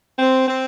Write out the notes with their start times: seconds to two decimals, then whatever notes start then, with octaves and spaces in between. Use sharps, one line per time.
0.18 C4
0.48 C4